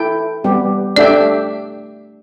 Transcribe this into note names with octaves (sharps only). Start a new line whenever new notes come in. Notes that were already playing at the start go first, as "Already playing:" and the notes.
Already playing: E4 A4 G5
G3 B3 G4
A3 D4 G4 D5 E5 G5